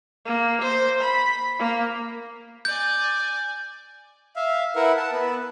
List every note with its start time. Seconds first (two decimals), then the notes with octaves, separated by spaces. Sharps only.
0.25 A#3
0.61 C5
1.01 B5
1.59 A#3
2.65 D5 G#5 G6
4.36 E5 F5
4.76 E4 A#4 B4 E5 F#5
4.97 F#5 A5
5.12 B3 B4